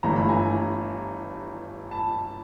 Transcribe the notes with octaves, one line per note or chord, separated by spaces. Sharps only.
G1 G2 E3 A3 A#5
B5
G#5 A#5
A5 B5